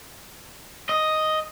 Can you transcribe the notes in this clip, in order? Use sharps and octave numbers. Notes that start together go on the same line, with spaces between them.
D#5